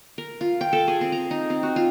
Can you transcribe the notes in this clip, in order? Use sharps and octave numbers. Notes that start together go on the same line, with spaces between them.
A#4
F4
G5
A4
G#4
C4
A#5
D#4
C4
F#4
F4